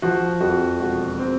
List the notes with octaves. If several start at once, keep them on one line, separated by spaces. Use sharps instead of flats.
F3 F#4
F2 F#4
E1 F#4
C4